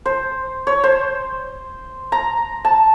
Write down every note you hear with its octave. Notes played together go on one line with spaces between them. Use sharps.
C5
C#5
C5
A#5
A5